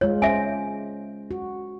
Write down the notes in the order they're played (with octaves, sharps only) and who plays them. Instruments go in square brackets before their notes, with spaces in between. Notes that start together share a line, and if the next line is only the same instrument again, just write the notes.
[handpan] G#3 F4 [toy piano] C#5
[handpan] C#4 C5 [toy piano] E5 G#5
[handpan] F#4